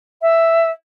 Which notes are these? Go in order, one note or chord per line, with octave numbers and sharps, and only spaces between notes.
E5